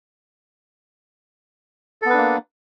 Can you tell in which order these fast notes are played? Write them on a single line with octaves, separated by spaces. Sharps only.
A4 B3 B4 D4 A#3